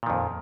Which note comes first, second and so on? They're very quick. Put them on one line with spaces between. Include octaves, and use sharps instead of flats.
A#2 D#3 F2